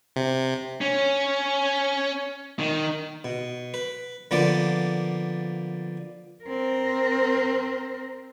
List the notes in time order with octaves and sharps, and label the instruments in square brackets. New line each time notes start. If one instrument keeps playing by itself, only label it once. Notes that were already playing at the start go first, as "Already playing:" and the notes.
[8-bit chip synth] C3
[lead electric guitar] C#4
D#3
[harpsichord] B2
B4
D3 F3 A#3 B3 F4 D5
[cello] C4 A#4